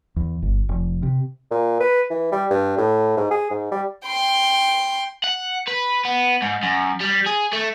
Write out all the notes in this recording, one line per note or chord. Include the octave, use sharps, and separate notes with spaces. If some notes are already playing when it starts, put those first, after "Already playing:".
E2
G1
F1
C3
A#2
B4
E3
G3
G2
A2
G#2
G#4
G#2
G3
G5 C6
F#5
B4
B3
G#2
F#2
G3
G#4
A3